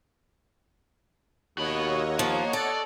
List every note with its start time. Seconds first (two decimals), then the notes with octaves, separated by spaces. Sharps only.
1.58 D#2 F#4 C#5 D#5 F#5 B5
2.19 F3 A#3
2.53 A4 D5